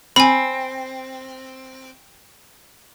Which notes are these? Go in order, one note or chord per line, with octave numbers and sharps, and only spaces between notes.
C4 G#5 B5